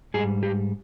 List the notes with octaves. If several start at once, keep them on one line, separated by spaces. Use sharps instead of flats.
G#2 G3 G#4
G4